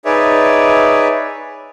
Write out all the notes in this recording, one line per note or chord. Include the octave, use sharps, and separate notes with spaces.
D#4 G#4 B4 C#5 D5 E5